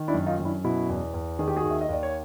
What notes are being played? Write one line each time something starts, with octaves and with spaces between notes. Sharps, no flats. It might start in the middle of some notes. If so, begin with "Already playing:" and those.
Already playing: D#3
D4 E4
F#2
D#4 F4
F#2
D4 E4
B2 E4 F#4
E2
E2
D#3 G#4
G4
F#4 G#4
D#2
E5
D#5
D#2 D5
C#5